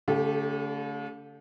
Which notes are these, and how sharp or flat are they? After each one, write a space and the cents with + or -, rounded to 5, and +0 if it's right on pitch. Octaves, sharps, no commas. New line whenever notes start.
D3 -45 A3 +0 G4 +0